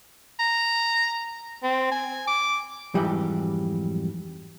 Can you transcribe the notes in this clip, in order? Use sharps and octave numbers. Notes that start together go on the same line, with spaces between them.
A#5
C4
G#5
D6
F2 G#2 E3 F#3 G3